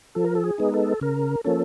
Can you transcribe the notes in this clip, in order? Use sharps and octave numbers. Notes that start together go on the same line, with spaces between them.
F3 A4
A#4
A4
G#4
G#3 B3 D#4
A4
C#3 A#4
F3 A#3 C#4 A4